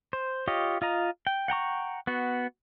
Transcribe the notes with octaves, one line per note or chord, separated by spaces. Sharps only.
C5
F4 G4 C#5 D#5
F4 D#5 A#5
G5
F#5 G5 A#5 C#6
B3 F#4